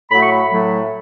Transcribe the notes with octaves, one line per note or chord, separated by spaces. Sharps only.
A2 F#3 A3 B5
C#6
B5
A2 F#3 A3